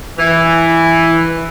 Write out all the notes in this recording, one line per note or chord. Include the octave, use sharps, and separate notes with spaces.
E3